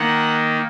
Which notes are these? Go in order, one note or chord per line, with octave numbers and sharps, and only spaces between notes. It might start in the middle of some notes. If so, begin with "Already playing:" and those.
Already playing: D#3 A#3 F#5